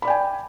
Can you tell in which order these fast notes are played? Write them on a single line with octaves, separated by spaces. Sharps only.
B5 D5 G5 G#5